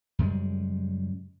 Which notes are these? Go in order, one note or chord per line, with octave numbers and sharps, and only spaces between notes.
F#2 C#3 G3 G#3